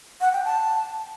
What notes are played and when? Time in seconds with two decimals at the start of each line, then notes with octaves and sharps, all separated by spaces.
0.21 F#5
0.33 G5
0.45 A5